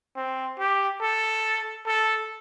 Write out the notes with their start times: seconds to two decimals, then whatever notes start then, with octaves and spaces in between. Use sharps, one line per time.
0.16 C4
0.59 G4
1.01 A4
1.86 A4